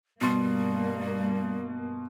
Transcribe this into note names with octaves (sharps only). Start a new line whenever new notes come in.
G2 B2 G3 A#3 C6